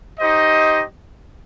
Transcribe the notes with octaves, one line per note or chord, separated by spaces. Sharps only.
D#4 G4 C5 D#5